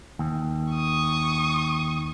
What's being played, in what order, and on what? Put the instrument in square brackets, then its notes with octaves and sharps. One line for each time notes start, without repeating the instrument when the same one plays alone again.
[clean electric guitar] D#2
[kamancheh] C#6 D#6